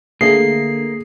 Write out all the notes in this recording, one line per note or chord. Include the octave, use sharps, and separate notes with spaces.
D3 A3 A#3 G#4 C7